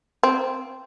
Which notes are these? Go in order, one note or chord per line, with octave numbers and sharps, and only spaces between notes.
C4